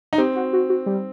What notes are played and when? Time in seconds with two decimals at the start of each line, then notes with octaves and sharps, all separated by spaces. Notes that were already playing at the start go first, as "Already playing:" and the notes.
0.13 D#4
0.18 C4 G4
0.36 F#4
0.53 F#4
0.70 F#4
0.86 G3